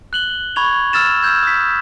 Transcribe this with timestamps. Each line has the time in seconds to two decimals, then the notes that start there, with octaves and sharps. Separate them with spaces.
0.13 F#6 F#7 G7
0.56 B5 C#6 G#6 F7
0.93 E6 F6 A6 E7
1.22 E6 F6 G6 G#6
1.43 D#6 B6